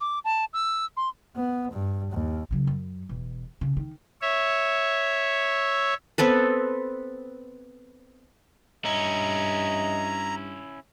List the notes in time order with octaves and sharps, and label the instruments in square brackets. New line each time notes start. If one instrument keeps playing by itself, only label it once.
[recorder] D6
A5
E6
C6
[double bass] B3
G2
D#2
[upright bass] C#3 F#3
F#2
E1
C#3
D#3
[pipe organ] C#5 E5
[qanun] B3 C4 A4 B4
[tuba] G2 [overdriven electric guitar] C#4 E4 [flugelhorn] D#5 [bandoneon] A#5